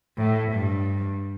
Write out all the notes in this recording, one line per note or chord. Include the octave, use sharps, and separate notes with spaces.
A2
G2